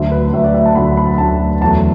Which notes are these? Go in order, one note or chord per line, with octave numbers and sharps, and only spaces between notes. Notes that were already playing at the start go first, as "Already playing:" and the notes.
Already playing: D2 D3 F#3 E5
B4
D2 D3 F#3 E5
D5
E5
A5
D2 D3 F#3 B5
B5
D2 D3 F#3 A5
E2 D3 F#3 A3 A5